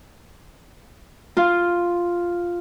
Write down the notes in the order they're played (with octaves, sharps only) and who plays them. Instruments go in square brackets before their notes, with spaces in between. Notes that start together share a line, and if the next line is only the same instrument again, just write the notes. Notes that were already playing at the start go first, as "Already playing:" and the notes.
[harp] F4